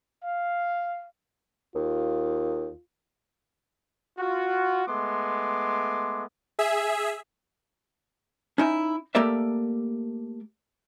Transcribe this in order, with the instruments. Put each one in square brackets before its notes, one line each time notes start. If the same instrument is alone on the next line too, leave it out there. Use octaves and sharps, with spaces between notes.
[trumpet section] F5
[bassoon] D#2 [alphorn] F4
[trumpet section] F4 F#4
G#3 A3 B3 C6 D6
[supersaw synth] G#4 E5
[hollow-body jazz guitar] C#4 D#4 E4 G#5
A3 A#3 G4 A#4 D5 E5